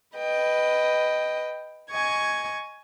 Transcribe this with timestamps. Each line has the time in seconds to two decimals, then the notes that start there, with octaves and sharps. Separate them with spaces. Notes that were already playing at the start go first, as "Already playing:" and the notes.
0.17 B4 D#5 G5
1.91 D#5 G#5 C#6 G#6